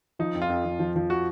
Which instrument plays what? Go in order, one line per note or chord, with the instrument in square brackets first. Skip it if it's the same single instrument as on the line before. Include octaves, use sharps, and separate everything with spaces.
[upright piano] F3 [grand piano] D#4
[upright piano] F2
[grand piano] F4
[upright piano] F2
F2
F3
F3
[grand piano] F#4